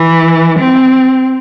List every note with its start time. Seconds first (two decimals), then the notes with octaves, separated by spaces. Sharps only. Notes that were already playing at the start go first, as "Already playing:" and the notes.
Already playing: E3
0.59 C4